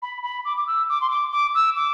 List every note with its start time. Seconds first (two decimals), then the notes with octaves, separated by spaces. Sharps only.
0.02 B5
0.23 B5
0.45 D6
0.57 D6
0.66 E6
0.89 D6
1.01 C6
1.10 D6
1.32 D6
1.54 E6
1.75 D6